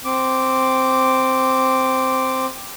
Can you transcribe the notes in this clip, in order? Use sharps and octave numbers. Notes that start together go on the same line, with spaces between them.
C4 D6